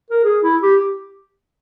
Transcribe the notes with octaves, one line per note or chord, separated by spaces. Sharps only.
A#4
G#4
E4
G4